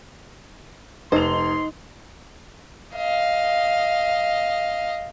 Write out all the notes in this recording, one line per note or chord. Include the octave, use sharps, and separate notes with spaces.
F1 D#4 C5 C6 F7
D#5 F5